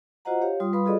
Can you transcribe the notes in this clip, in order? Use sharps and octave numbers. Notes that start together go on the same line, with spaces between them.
F4 F#4 C5 D#5 F#5 A#5
G4 C#5 F5
G3 F4 C6 D#6
G3 B4 F5 B5 C6 D#6
F4 F#4 G#4 A4 D5 D#5